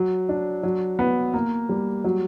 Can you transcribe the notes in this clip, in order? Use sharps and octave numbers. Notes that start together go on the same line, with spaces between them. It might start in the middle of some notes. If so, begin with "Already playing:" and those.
Already playing: F#3
D4
F#3
B3
A#3
G3
F#3